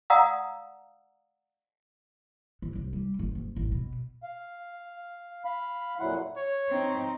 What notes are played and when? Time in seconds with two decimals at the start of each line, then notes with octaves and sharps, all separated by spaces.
0.10 D5 F5 F#5 A#5 D#6 E6
2.62 D3
2.75 C2
2.93 G3
3.19 F#1
3.35 F#1
3.56 A1
3.72 B2
4.23 F5
5.45 F5 B5
6.00 F2 A#2 F#3 E4 F#5 C6
6.36 C#5
6.70 C4 D#4